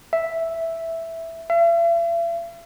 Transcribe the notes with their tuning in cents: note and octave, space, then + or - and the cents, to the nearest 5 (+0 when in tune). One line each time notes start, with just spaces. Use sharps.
E5 +0
E5 +45